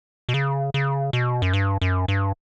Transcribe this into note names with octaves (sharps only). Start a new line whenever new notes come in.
B2
C#3
C#3
B2
F#2
G2
F#2
G2